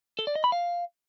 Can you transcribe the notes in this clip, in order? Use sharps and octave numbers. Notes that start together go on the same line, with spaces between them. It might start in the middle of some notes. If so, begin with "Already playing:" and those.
A4
D5
D#5
B5
F5